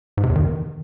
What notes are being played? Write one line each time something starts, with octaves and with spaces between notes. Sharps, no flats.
G#2
C3
E2
D#3